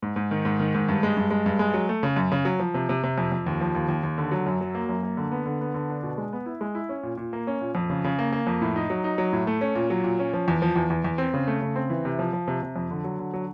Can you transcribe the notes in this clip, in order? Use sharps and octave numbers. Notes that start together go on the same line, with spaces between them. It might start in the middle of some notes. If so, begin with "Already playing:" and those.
G#2
G#2
D#3
G#2
D#3
G#2
G2
G#3
G2
G#3
G2
G#3
F#3
A3
C#3
F#2
C#3
F#3
F3
C3
C3
C3
F2
F2
D#2
F3
D#2
D#2
D#2
D3
F#3
F#2
F#3
A#3
F#2
A#3
D3
B3
D3
B3
D3
D4
B2
G#3
B3
E4
G#3
E4
C#4
A#2
A#2
A#3
C#4
A#2
F2
C#3
C#3
A#3
A#3
F2
A2
D#4
F#3
D#4
F#3
A2
A3
C#4
A#2
F#3
A#2
C#4
F3
E2
F3
E2
E2
E2
C4
C#3
A3
C#3
C4
E3
C3
F3
F3
C3
C3
F2
D3
F#3
D3
F#3